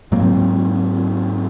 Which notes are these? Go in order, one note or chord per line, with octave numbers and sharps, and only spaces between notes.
G#2 F#3 A#3 C4